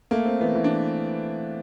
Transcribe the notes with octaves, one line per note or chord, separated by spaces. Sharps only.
A3 A#3
C4
E3 B3
E3
D4